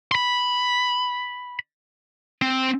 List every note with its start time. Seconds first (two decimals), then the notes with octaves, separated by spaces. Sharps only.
0.12 B5 C6
2.42 C4